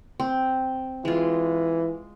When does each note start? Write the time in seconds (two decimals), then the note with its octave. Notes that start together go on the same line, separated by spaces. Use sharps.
0.20 C4
1.05 E3 G#3 F4